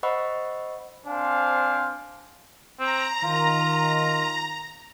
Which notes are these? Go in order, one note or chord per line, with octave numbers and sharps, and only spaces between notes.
C5 D#5 F#5 B5 C#6 E6
C4 D4 C5 F5 G#5
C4 A#5
D#3 F4